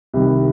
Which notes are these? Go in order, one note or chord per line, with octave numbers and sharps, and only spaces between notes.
C2 C3 D#3